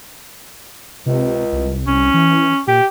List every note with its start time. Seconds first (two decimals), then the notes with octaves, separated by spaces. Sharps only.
1.06 C#2 C3
1.52 C2
1.87 C2 C#4
2.14 E3
2.68 A#2 G4